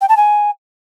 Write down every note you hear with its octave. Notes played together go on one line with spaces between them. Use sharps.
G5
A5
G#5